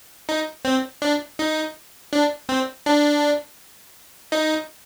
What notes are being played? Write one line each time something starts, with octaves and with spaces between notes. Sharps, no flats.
D#4
C4
D4
D#4
D4
C4
D4
D#4